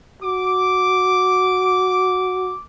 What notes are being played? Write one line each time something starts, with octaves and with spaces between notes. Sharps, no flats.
F#4 D6